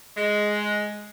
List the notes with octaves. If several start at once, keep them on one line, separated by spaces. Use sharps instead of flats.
G#3